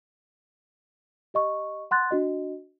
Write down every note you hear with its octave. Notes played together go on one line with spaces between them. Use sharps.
G4 D#5 C#6
F#5 C6 F#6 A6
D4 F#4 D#5